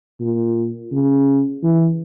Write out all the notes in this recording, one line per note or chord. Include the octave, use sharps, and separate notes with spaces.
A#2
C#3
E3